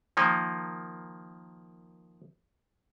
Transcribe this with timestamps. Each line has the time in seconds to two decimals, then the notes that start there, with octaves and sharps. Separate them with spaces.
0.17 D#3 F3 A#3